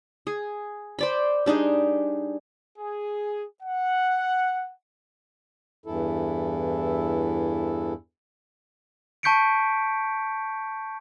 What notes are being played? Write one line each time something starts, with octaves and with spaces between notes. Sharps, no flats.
G#4
C5 D5 B5
G3 D4 D#4 G#4
G#4
F#5
E2 G2 E3 E4 A4
A5 C#6 G6 B6 C#7 D7